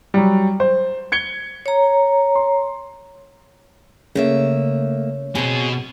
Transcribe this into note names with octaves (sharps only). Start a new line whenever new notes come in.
F#3 G3
C5
G#6 C#7 G7
C#5 A#5
C6
C#3 A3 A#3 C#5 E5
B2 C4 G#4